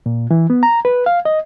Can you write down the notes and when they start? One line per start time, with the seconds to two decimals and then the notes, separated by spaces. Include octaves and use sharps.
0.06 A#2
0.31 E3
0.50 B3
0.63 A#5
0.85 B4
1.06 F5
1.25 D#5